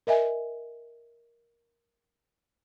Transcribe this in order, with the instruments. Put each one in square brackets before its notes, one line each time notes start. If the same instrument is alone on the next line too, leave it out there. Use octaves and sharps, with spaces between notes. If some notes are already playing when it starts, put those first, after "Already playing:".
[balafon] A#4 D#5 E5 G#5